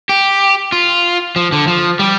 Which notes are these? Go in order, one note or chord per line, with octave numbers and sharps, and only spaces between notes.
G4
F4
F3
D3
F3
G3